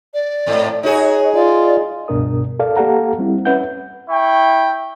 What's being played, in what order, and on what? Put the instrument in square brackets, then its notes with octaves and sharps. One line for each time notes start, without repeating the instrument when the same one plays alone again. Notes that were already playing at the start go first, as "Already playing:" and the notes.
[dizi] D5
[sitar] G#2 A3 C4
[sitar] D#4 F#4 G#4 [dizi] C#5
[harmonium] F4 [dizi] D5
[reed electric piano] C#2 G2 B2 D4 A#4 D#6
A4 A#4 D5 F5
A#3 G4 A4 F5 F#5 A#5
G3 C4 E4
C#4 B4 E5 F#5 G6
[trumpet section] E4 G5 C#6